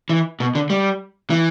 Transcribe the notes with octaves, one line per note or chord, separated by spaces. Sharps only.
E3
B2
D3
G3
E3